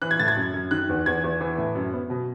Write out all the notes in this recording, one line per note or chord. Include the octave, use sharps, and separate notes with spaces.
E3 F#6
G#6
A2 A6
G#6
F#2
F#2
D#3 F#6
E2
E2 G#6
E2
E3
A2
F#2
B3
B2